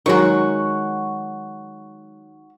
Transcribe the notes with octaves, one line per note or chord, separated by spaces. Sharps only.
D#3 F#3 G#3 F#4 C#6